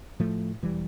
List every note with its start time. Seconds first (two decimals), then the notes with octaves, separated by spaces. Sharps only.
0.19 A2 F3 A3
0.62 E1 E3 G3